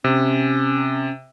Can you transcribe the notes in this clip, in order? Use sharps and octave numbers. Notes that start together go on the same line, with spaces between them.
C3 C#4